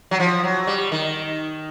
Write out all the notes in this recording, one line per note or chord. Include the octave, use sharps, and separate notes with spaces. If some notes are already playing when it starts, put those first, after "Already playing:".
F#3
F3
F#3
G3
D#3